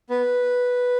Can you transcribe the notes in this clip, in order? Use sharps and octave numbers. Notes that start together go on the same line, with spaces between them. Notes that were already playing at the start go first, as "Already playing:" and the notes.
B3 B4